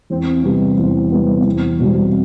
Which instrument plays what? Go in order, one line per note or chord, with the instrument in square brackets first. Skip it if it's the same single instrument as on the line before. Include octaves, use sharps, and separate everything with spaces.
[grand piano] E2 [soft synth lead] C4
[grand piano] C3 G3 B3
E2
C3 G3 B3
[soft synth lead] B3
[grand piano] E2 [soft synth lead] C4
[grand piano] B2 G3